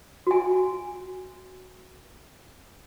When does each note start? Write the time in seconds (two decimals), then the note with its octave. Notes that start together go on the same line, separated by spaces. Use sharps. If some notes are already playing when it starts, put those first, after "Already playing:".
0.27 F#4 G#5